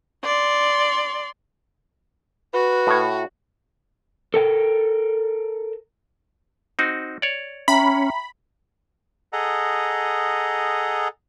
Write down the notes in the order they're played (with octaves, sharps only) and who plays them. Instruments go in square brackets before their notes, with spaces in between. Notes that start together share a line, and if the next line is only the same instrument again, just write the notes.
[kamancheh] D5 C6
[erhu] F#4 [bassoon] B4
[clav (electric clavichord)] A2 C#5
[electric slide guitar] A4 A#4 G5
[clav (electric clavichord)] C4 D#4 F#4
C#5 D5
[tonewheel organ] C#4 [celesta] E5 G5 A#5 [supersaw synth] B5
[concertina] G#4 A4 D#5 F#5 A#5